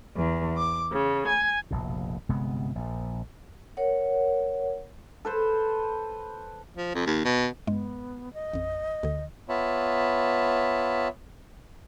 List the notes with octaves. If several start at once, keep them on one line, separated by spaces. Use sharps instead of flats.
E2
D6
C#3
G#5
F1 A#1 B2
G1 C3 G#3 B3
A#1 A#2
A#4 C#5 F#5
A4 B4 C5
F3
F2
D#2
B2
G2 G#3 B3
D#5
A1 F2
D2 D3
B3 F4 C#5 E5 A5 B5